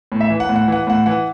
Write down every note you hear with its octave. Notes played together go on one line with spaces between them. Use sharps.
A2
E5
E3
F#5
A2
F#5
E3 F#5
A2 F#5
E3 F#5